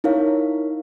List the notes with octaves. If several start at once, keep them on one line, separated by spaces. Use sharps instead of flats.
D#4 E4 A#4 C#5 F5